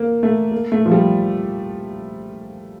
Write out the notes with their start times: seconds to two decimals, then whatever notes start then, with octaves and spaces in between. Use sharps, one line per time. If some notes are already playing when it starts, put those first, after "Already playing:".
Already playing: A#3
0.23 A3
0.52 A#3
0.72 A3
0.85 F3
0.92 G3